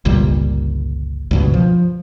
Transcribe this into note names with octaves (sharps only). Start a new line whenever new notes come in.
G1 C#2 A#2 G3
C#2 G2 B2
F3